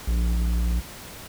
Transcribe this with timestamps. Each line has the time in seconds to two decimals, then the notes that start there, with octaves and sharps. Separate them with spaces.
0.07 A#1